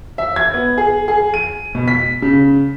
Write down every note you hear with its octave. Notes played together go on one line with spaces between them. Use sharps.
E5
G#6
B3
G#4
G#4
D#7
B2
B6
C#3